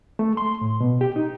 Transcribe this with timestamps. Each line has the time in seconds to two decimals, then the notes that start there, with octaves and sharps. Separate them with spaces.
0.19 A3
0.37 C6
0.61 A2
0.80 B2
1.01 G4
1.16 D#4